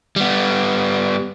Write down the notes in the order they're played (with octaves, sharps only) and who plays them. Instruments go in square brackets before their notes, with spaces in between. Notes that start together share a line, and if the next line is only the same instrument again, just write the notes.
[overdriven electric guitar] G3 B3